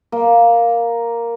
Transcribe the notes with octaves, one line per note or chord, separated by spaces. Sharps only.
A#3